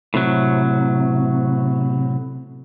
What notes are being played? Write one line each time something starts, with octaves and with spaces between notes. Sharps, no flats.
A2 C3 F#3